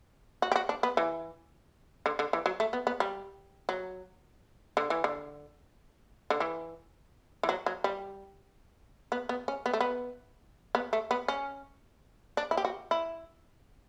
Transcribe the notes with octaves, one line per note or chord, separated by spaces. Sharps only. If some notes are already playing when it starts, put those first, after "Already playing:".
F#4
G4
F#4
D4
B3
E3
D3
D3
E3
F#3
A3
B3
B3
G3
F#3
D3
E3
D3
D3
E3
E3
F#3
F#3
G3
B3
B3
C#4
B3
A3
B3
B3
A3
B3
C#4
D4
E4
G4
F#4
E4